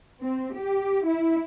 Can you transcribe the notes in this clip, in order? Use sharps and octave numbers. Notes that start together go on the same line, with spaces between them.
C4
G4
E4